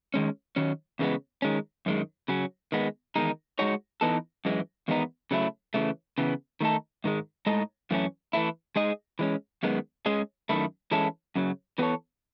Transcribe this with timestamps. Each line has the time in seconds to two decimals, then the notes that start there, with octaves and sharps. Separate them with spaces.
0.14 D#3 G#3 C#4
0.56 D#3 F#3 C#4
0.99 E2 C#3 E3 G#3 B3
1.42 D#3 G#3 C#4
1.86 F#2 D#3 G#3
2.28 C#3 F#3 C#4
2.72 D#3 G#3 B3
3.16 E2 D#3 G#3 D#4
3.59 G#3 D#4 F#4 C#5
4.01 E3 B3 D#4 A4
4.45 F#2 E3 G#3
4.88 E2 D#3 G#3 B3 D#4
5.31 C#3 F#3 A3 E4
5.74 C#3 E3 A3
6.18 C#3 E3 B3
6.61 D#3 A3 D#4 A4
7.04 G#2 D#3 G#3
7.46 A2 G#3 D#4 A4 D#5
7.91 F#2 E3 A3 C#4
8.33 E3 A3 E4
8.76 G#3 D#4 G#4 D#5
9.19 E3 G#3 C#4
9.63 F#2 D#3 G#3 B3
10.06 G#3 C#4 G#4 D#5
10.49 F#2 D#3 A3 E4
10.91 E3 G#3 C#4 E4 A4
11.36 F#2 C#3 F#3
11.78 E3 B3 F#4 A4 C#5